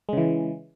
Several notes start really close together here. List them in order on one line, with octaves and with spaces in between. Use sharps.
G#3 C#3 E3